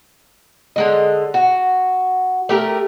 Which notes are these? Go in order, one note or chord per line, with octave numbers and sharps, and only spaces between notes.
D3 G#3 D#5
F#4
A3 G4 A#4